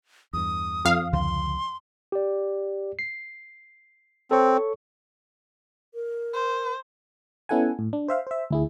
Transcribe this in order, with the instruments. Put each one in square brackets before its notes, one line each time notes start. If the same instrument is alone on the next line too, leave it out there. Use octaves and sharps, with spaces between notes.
[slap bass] E2 G2 [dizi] D#6
[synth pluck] F2 F5
[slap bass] C#2 D3 F3 [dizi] C6
[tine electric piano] G4 D5
C7
[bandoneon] C4 [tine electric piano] A4 C#5 C#6
[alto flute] A#4
[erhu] C5
[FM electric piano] B3 C#4 E4 A4 F#5 G#5
A2
D4
C5 E5 F5
C5 E5
D2 E4 G#4